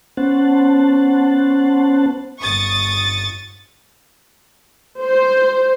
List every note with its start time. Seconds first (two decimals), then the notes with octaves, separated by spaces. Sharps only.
0.17 B3 C#4 C5 F#5 A5
2.41 G1 C#6 D#6 A6
5.02 C5